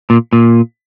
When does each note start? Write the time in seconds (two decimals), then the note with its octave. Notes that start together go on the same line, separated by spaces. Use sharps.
0.10 A#2
0.33 A#2